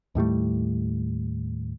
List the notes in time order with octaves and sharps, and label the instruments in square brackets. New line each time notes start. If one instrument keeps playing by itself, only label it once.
[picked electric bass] D#2 A2 G3 A3